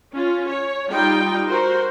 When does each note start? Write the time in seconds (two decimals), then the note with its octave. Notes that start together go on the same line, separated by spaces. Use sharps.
0.13 C#4 F4
0.48 C#5
0.88 G3 D#4 F4 G5
1.47 F#4 A#4 C5